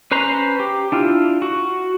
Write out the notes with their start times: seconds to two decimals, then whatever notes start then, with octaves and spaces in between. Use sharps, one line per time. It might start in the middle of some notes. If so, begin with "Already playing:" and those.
0.11 C#4 B4 C5 A#5 C6
0.60 G4
0.92 D4 E4 F4
1.42 F#4